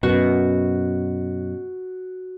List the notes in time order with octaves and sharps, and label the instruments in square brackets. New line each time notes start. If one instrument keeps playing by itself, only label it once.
[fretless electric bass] F#2 B2 [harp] F#4